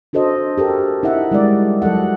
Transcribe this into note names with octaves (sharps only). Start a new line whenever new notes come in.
D4 F#4 A4 C5 D#5
G4 A4 A#4
D#4 E4 E5 F#5
G3 G#3 E4 A#4 D5
F#3 A4 D#5 F#5